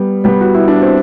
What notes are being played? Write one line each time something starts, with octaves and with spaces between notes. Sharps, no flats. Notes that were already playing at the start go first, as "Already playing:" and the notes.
Already playing: G3 B3
G3 B3
F#4
E4
D4
C4